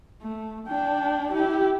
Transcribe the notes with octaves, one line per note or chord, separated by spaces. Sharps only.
A3
D4 G5
E4 G4